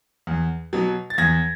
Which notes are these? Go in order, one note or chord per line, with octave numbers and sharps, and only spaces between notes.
E2
B2 F#3
A6
E2 G#6 A#6